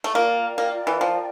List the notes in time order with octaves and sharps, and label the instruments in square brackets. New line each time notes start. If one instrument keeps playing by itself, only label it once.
[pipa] A3
[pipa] A#3 [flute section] F4 A#4 D5 G5
[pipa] A#3
E3
F3